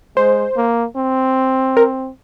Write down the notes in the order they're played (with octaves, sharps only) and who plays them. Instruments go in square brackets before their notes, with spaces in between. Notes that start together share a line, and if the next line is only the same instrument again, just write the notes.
[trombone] G#3 [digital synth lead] C5
[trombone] A#3
C4
[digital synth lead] A#4